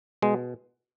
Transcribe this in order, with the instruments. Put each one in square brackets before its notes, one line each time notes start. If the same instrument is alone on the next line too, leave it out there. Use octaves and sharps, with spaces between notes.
[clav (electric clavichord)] B2 G#3